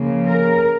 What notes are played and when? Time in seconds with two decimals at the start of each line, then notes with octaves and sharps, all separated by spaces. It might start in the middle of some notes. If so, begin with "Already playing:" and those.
Already playing: C#3 F3 A#3
0.27 A#4